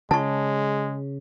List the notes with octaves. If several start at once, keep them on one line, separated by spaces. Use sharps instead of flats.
C#3 G#3 A5 C#6